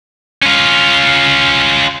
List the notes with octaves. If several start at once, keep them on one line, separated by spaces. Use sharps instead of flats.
C#4 F4